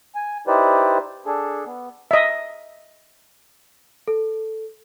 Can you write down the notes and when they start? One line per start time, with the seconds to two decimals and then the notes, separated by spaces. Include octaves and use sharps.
0.15 G#5
0.47 D#4 E4 G4 B4 C5 D5
1.26 D4 G#4 A4
1.66 B3
2.11 D#5 E5
4.08 A4